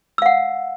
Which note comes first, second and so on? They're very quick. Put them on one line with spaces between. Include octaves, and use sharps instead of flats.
E6 F5 F#5